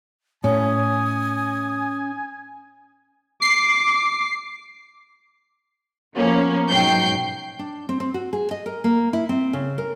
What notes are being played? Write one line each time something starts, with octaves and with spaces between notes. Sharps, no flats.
A2 C#4 G#5 D#6
D6 C7
F3 A#3 B3 C#4
B1 G#2 F#3 G5 G6 C7
D4
C4
C4
F#4
G#4
D#5
A#4
A#3
E4
C4
C#3
A#4